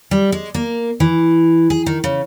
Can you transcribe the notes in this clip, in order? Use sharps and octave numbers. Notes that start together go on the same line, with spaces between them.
G3
G#3
A#3
E3
G#4
D#3
C#3